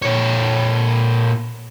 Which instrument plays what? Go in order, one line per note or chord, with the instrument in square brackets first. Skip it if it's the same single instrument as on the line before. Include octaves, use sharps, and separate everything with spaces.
[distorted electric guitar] A#2 C#5